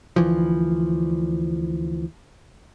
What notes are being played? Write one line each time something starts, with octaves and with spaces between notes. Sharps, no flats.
D2 E3 F3